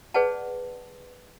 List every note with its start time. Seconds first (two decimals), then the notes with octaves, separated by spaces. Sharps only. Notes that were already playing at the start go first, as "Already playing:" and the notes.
0.14 G#4 B4 C#5 D5 F#5 A5